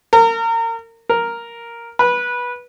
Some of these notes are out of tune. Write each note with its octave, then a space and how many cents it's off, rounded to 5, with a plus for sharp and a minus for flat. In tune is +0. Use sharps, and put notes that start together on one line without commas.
A#4 -30
A#4 +0
B4 -15